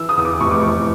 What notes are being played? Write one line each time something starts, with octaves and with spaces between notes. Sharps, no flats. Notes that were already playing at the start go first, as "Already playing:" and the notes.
Already playing: E3 E6
D#6
E2
D6
F1 C#6
D6
E3 C#6